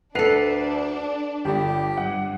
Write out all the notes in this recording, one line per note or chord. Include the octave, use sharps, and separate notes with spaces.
D2 D4 A4 B4 F#5 C7 F7
G1 G3 G4
G2 F#5